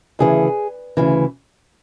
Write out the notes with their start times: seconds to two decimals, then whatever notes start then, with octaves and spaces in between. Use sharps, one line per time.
0.19 D2 C#3 E3 G#4
0.97 D2 C#3 E3